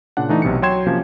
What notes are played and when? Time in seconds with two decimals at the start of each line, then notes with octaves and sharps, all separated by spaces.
0.17 A#2 C#3 D4 F#5
0.29 E3 A3 D4 D#4
0.42 B1 C3 B3 C#7
0.62 F#3 C#5 G5 C6 G#6 E7
0.87 C3 F3 A#3 C#4